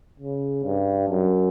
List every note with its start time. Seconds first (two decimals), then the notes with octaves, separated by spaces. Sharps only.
0.20 C#3
0.65 G2
1.09 F#2